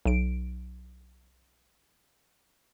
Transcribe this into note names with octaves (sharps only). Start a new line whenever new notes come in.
B1 D7